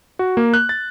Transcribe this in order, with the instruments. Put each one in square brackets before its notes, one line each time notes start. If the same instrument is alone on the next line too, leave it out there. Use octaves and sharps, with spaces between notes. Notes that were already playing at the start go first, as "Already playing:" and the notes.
[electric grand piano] F#4
A#3
F#6
A6